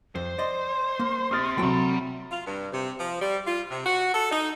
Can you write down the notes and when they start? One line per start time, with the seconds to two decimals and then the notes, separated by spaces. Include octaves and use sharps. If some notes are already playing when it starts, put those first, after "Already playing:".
0.15 F2 C5
0.38 D5 D#5 C6
0.99 A#3
1.31 C4 G4 D#6 F6 A6
1.58 C3 F#3 A3 F#4 G5 B5
2.31 F4
2.46 G2
2.72 C3
2.98 F3
3.20 G3
3.46 F4
3.70 C3
3.85 F#4
4.13 A4
4.31 D#4